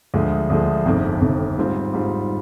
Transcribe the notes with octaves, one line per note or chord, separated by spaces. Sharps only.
D2 D3 F3 G#3
D2 D3 F3 G#3
G1 F2 C3 D#3
G1 F2 C3 D#3
G#2 G3 C4 F4
G#2 G3 C4 F4